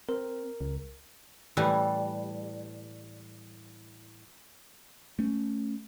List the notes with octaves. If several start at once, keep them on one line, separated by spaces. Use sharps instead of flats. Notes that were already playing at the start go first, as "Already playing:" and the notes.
C4 A#4
C#2
A2 E3 G3
A3 C#4